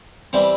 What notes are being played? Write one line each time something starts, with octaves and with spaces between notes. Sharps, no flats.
E3 G3 C4 C5